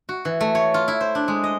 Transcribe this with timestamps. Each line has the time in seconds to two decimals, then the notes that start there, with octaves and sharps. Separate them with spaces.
0.09 F#4
0.25 E3
0.41 A3
0.55 C#5
0.74 F4
0.88 E4
1.01 C5
1.15 D4
1.28 G#3
1.44 D#5